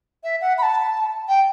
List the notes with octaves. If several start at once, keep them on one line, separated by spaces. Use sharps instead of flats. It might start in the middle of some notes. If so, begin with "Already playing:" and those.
E5
F#5
B5
A5
G5